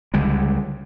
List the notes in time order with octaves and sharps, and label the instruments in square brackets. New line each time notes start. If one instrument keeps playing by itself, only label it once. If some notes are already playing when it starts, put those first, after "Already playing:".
[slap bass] C#2 D3 G3 G#3